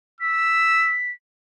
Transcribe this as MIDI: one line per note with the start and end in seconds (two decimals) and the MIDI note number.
0.21 0.95 88
0.21 1.11 95